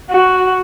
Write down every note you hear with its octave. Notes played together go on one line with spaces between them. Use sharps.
F#4